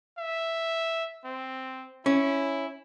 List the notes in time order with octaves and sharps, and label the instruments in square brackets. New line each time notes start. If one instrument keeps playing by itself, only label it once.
[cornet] E5
C4
[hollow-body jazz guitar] C#4 [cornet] E4